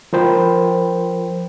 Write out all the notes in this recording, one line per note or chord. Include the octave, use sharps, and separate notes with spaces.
F3 A#4 C5 G5 B5